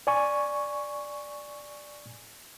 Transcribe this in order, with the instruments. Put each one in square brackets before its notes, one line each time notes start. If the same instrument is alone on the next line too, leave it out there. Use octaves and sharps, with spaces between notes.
[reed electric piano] D5 G#5 C#6